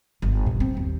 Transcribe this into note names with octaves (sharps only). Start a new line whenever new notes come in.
G1
A#2
C4
D#2